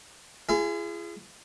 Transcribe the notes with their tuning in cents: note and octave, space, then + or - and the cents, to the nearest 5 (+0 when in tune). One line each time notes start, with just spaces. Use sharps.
F4 -45 G#4 +0